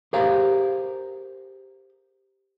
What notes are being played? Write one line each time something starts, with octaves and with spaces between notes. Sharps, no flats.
G4 G#4 A#4 C5 F5